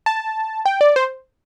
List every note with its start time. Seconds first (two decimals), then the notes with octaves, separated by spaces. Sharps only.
0.06 A5
0.66 G5
0.81 D5
0.96 C5